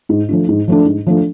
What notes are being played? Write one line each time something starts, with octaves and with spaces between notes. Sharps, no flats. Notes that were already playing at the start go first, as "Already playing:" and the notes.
G#2
F3 A3 D4
G#2
F3 A3 D4
G#2
F3 A3 D4